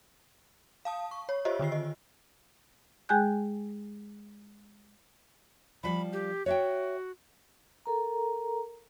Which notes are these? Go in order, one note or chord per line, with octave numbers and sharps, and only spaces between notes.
F5 A5 D#6
C#6
C#5
F4 G4 C5 C#5 D#5 E5
D3 D#3 F4 C7
D#5
G#3 G#4 G5 G#5 F#6 G6
F3 G3 B5
G4
F#4 C#5 E5 G5
A4 A#4 A#5